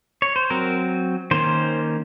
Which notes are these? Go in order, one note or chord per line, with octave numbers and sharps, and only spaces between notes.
C#5
C5
F#3 C4 A#4
D#3 A#3 C#4 C5